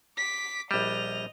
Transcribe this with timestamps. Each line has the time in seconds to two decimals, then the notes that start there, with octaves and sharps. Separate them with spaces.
0.17 D6 B6
0.71 A#1 G3 D#5 F7